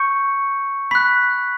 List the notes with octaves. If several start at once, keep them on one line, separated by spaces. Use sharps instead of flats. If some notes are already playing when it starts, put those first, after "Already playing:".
Already playing: C#6 G6 C#7
B5 F#6 B6